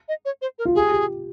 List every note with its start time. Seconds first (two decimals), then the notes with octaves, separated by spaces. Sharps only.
0.08 D#5
0.25 C#5
0.42 C5
0.59 A#4
0.65 F4
0.75 G4 G#4
0.92 G4